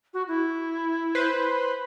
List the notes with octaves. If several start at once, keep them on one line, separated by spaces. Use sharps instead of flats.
F#4
E4
B4 C5